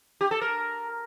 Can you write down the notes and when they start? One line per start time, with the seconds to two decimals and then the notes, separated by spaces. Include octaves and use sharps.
0.21 G4
0.31 A4
0.41 A#4